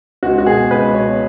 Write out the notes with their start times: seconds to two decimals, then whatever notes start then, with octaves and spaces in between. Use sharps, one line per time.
0.23 C#2 F#4
0.38 F#4
0.46 B2 G#4
0.71 C#2 B4
0.94 B2 C#5